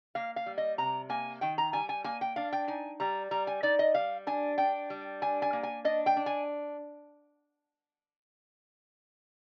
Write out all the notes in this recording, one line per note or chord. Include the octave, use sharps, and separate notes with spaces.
A#3 F5
F5
G3
D#5
C3 A#5
A#3 G#5
D#3 G5
A#5
G3 G#5
G#5
A#3 G#5
G5
D4 F5
G5
D#4 G#5
G3 A#5
G3 A#5
G#5
D#4 D5
D#5
G3 F5
D4 G#5
D4 G5
G3
D4 G#5
G#5
A#3
G#5
D4 D#5
G5
D4
G#5